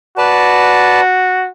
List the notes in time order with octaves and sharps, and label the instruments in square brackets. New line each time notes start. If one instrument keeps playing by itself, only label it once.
[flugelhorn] F#4 [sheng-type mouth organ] B4 D5 A5